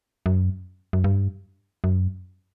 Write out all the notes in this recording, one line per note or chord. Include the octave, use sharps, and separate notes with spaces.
F#2
F#2
G2
F#2